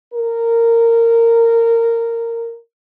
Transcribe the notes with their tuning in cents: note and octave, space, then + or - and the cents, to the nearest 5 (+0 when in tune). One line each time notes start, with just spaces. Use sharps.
A#4 -15